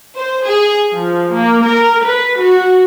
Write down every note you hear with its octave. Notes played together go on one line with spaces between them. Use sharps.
C5
G#4
F3
A#3
A#4
B4
F#4